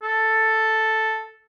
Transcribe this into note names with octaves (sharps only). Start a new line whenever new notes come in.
A4